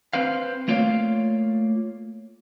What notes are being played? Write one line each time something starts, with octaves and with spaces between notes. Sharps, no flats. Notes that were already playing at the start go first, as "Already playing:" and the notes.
C4 B4 C5 F5
A3 A#3 F4 C#5 D5 F5